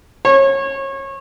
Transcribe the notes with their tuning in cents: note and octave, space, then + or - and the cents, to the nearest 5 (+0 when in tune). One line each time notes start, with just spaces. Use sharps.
C#5 -25